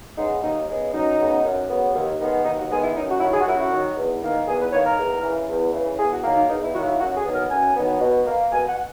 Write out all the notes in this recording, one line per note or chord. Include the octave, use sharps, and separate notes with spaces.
C#3 G#3 B3 D#4
D#2 D#4
C#3 G#3 B3
F#2 D#4
C#3 F#3 B3
F#2
C#3 F#3 B3
D#2
D#3 G#3 B3
D#2 D#4
F#4
D#3 G#3 B3 G#4
E4
F#2 D#4
F#4
D#3 F#3 E4
G#4
F#4
F#2 E4
F#4
D#3 F#3
E2
D#3 A#3
E2 G#4
B4
D#3 A#3 C#5
A#4
E2
C#3 E3
E2
C#3 E3
E2 G#4
F#4
D#3 F#3 A#3
D#4
E2 D#4
E4
D#3 F#3 A#3 F#4
E4
F#2 F#4
G#4
D#3 F#3 B3
A#4
F#2 G#5
D#3 F#3 B3
B2
A#3
B2 G#5
F#5